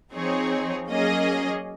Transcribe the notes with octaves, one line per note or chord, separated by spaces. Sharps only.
F3 C4 D#4 G#4 C#5
F#3 A#3 C#4 G#4 D#5